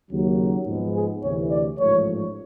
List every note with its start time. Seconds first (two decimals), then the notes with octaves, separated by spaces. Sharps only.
0.11 D#2 C#3 F#3
0.66 G#2 F3 G#3 B3
0.96 G#4
1.24 D2 C3 E3 C#5
1.51 D5
1.80 A1 G#2 F3 A3 C#5